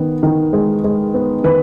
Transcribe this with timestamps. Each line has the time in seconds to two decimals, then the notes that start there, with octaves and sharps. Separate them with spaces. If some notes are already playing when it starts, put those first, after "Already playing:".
Already playing: D#3 B3
0.23 D#3
0.53 G#3
0.84 G#3
1.14 B3
1.44 D#3 B4